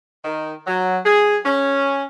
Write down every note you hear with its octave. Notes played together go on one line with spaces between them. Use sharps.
D#3
F#3
G#4
C#4